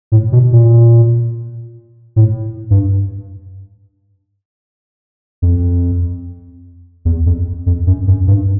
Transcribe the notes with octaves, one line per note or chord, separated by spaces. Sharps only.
A2
B2
A#2
A2
G2
F2
E2
F2
F2
F#2
F#2
G2